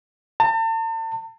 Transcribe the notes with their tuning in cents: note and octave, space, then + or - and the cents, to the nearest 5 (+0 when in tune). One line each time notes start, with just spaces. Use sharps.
A5 +40